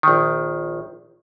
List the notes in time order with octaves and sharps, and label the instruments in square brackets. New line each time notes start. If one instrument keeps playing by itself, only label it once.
[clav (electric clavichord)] A#1 D#3